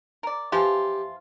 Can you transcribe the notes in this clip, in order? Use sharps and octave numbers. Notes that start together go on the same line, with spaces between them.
A#4 D5
E3 F3 F4 G4